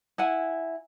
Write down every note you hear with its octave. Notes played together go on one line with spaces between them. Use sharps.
E4 F#5 G#5